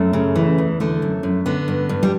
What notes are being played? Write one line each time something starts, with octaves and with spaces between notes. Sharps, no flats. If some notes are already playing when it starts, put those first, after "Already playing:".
Already playing: F#2 A3
C#3
E3
E2
D3 A3
F#2
F#2
D3 B3
G2
G2
G3